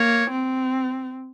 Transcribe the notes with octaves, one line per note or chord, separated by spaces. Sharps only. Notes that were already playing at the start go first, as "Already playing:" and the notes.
Already playing: A#3 C#5
C4